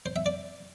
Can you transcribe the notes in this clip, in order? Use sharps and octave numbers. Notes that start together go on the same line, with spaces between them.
C5
E5
D5